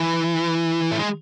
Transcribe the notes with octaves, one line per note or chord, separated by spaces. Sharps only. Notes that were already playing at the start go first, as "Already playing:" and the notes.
Already playing: E3
A3
G#3